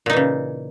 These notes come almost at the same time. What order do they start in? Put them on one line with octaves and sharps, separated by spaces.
A#2 D#4 E3 C#3